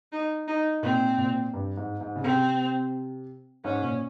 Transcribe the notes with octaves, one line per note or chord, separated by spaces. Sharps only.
D#4
D#4
A#2 C4
A#2
G2
G#2
G#2
C#3
C3 C4
G#2 C#4
A#2